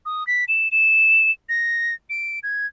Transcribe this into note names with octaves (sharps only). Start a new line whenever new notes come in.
D#6
B6
E7
E7
A#6
D7
G#6